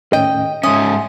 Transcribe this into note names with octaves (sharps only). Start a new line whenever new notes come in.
D#2 A2 C#4 D#5 G5
G#2 C#4 E5 G#5 C6 D#6